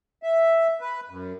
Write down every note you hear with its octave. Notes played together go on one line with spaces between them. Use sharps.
E5
B4
F#2